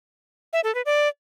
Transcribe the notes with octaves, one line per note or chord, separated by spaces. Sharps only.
E5
A4
B4
D5